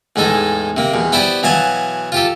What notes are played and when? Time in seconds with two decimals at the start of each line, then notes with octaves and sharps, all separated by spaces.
0.16 E2 A2 G#3 D#4 A4
0.77 C3 A#3
0.94 E2 B2
1.12 B3 E4 G4 C5 D5
1.43 B2 E3 F#3 F5 G#5 A5
2.12 F4 G4 A4